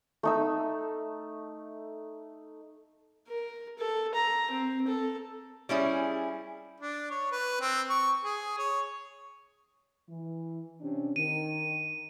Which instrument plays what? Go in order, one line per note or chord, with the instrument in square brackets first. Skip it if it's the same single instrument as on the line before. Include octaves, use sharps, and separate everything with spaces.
[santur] A3 D#4 E6
[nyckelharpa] A#4
A4
A#5
C4
A4
[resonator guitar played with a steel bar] G3 C#4 E4 G#4
[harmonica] D4
C#5
B4
C4
C#6
G#4
C#5
[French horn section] E3
C3 C#4 D4
[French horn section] D#3 [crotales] D#7